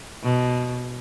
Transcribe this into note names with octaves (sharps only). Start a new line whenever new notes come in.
B2